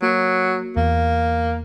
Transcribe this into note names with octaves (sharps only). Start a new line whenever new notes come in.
F#3 A#3 F#4
E2 A#3